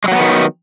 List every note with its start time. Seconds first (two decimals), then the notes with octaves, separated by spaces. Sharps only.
0.04 G#3
0.08 F#3
0.12 A#3
0.16 B3
0.19 D#3